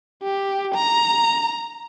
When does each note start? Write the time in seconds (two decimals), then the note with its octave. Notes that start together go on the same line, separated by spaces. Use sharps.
0.23 G4
0.75 A#5